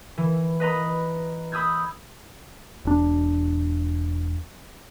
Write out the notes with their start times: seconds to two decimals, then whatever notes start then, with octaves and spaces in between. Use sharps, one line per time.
0.18 E3
0.60 B4 D#5 A#5 B5
1.52 B5 D#6 E6 G6 G#6
2.85 E1 D4